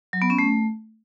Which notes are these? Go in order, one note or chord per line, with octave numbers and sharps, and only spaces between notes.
F#3
B3
C#4
A3